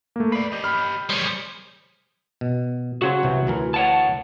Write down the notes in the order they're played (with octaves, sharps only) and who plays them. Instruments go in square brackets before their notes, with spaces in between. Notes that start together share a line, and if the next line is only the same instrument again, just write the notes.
[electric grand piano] A3 A#3
[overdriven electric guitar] B4 D5 [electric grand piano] C7
[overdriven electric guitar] G4 D#5
[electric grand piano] B5 F6
[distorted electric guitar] G3 G#4 [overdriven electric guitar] C5 C#5
[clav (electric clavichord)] B2
[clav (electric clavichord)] C#3 C5 [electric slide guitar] F#4 C#5
[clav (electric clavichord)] C2 C3 E3
D2 E3 A#4
[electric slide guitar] C#5 F#5 A5